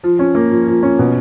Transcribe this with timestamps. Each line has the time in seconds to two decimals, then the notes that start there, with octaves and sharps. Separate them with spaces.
0.03 F3
0.19 C#4
0.35 A#3
0.51 F3
0.67 F3
0.83 C#4
0.99 B2